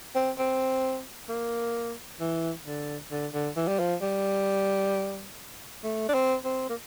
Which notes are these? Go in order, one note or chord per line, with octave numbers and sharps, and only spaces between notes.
C4
C4
A#3
E3
D3
D3
D3
E3
G3
F3
G3
A3
D4
C4
C4
A#3